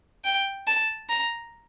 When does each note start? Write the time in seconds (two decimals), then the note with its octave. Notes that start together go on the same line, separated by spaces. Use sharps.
0.25 G5
0.67 A5
1.09 A#5